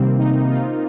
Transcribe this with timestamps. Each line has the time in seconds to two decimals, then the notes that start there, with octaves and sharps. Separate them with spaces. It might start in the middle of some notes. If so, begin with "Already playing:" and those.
Already playing: C3 D#3 G3 A#3 C4
0.18 D#4
0.49 F4